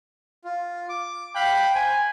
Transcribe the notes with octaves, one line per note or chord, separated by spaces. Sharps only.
F4
D6
F5 G5 B5 F#6
C5 G#5